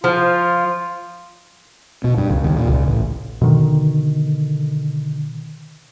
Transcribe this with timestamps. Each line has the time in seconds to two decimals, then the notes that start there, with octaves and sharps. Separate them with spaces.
0.04 F3 F4
2.04 B2
2.17 G2
2.30 C#2
2.44 D#2
2.57 A#2
2.69 C#2
2.87 A1
3.41 B2 D3 D#3